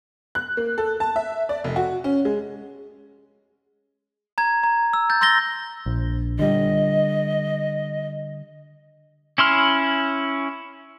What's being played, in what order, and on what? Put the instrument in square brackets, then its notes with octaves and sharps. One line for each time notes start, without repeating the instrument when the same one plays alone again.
[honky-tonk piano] F#6
A#3
A4
A5
E5
D5
F1
F#4
C#4
G#3
[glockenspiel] A#5 G#6
A#5
E6
G6 A6
C6 E6 A6 A#6 G7
[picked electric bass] A#1
[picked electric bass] D3 G3 [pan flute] D#5
[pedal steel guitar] C#4 E4 C6 F6